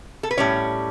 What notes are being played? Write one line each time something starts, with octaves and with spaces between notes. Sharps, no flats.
A4
B4
A2 G3 C#4 C#5